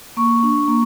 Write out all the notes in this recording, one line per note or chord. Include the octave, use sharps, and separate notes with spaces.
A#3 C#6
D4
A#3